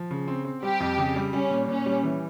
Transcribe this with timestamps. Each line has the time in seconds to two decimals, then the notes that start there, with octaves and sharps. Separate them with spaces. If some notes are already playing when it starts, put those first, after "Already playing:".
Already playing: F3
0.11 C#3
0.28 C4
0.45 C4
0.63 G3 G4
0.80 F2
0.98 C#3
1.16 G3
1.33 G3 C#4
1.50 A#2
1.68 A#2 C#4
1.86 G3
2.03 E3